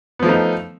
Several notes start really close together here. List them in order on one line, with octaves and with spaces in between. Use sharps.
B3 F3 A3 D#4